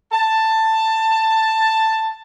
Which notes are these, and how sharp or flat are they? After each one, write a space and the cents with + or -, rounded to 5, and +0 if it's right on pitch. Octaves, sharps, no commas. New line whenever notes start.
A5 +10